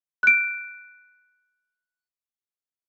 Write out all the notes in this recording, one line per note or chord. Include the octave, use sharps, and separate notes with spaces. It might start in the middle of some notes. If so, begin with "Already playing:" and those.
F#6 D7